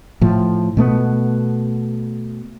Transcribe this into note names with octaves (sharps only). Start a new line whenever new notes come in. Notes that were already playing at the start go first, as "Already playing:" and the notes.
A2 F3
B2 A3 B3